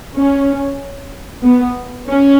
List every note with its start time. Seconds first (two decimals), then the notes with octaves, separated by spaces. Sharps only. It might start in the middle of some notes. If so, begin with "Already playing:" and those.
0.15 C#4
1.45 B3
2.09 C#4